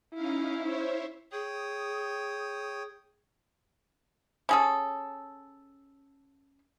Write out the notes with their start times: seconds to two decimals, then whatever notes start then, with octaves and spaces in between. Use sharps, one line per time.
0.14 C#4 D#4 E4 F5
0.61 C5 C#5 E5
1.32 G#4 C#5 G5 D#6
4.49 C#4 G#4 A4